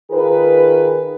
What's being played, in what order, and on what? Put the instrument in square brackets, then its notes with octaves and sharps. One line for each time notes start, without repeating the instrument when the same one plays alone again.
[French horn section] D#3 F4 G#4 A#4 B4